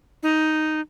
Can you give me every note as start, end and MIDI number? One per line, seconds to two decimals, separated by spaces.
0.23 0.80 63